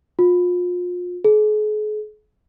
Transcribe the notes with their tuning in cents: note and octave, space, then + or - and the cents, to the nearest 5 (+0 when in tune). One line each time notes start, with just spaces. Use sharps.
F4 +35
G#4 +40